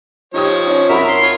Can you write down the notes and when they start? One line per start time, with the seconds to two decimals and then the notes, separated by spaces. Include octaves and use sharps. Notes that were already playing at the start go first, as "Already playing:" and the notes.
0.34 F3 D#4 G4 C#5 D#6
0.67 C#4 D#4
0.89 F2 F#4 A#4 E5 B5
1.08 C6
1.22 F4 C#5